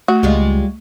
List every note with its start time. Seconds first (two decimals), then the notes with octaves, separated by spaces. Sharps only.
0.08 A3 F#4
0.23 C#2 G3 G#3 F4